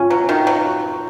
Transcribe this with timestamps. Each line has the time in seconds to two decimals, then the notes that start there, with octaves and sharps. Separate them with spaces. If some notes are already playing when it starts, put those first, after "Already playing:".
Already playing: C#4 F4
0.10 F#3
0.29 D#3
0.47 F#3